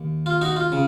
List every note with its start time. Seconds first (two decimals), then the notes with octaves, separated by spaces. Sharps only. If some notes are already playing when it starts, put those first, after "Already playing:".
Already playing: D#2
0.26 F4
0.41 D#4 F#4
0.56 F4
0.72 C#3